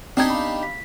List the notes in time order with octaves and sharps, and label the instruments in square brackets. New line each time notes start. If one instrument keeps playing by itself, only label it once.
[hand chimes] B3 C7 [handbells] C4 G#6 [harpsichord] D4 D#4 G4
[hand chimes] F5 B5
B6